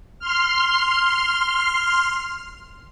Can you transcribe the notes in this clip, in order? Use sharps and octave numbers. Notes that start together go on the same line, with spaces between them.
C6 F6